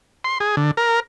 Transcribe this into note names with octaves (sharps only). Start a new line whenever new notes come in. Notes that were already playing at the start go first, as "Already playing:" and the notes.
C6
G#4
D3
A#4